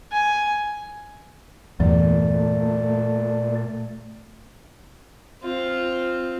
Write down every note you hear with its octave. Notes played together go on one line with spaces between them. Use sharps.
G#5
E2 G2 A#2 A3 D5
C4 F4